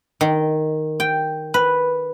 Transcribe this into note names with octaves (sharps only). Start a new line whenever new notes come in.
D#3
G5
B4